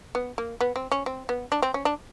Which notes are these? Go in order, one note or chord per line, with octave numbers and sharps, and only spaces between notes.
B3
A#3
B3
C4
C#4
C4
B3
D4
C4
C#4
D4